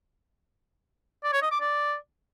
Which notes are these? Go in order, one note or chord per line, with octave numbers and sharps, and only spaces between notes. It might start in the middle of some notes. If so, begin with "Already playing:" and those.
D5
C#5
D#5
D6
D5